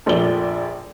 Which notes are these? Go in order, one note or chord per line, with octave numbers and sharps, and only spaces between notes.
F1 A#1 A#2 F3 D4 G7